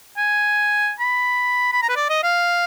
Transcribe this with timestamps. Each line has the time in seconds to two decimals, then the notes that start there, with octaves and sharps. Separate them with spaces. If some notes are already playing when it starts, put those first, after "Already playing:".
0.18 G#5
1.00 B5
1.72 B5
1.83 A#5
1.89 B4
1.96 D5
2.10 D#5
2.24 F5